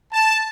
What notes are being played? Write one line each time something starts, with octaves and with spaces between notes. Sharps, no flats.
A5